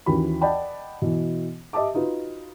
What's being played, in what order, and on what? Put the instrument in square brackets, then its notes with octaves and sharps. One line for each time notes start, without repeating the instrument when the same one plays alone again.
[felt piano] D#2 E3 C#4 F#4 B5
D5 D#5 F#5 G5 A5 B5
B2 E3
G4 D#5 E5 A5 D6
D#4 F4 F#4 B4